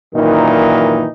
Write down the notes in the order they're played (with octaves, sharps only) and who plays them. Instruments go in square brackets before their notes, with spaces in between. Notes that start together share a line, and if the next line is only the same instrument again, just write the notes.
[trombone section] F#2 A#2 D#3 E3 D#4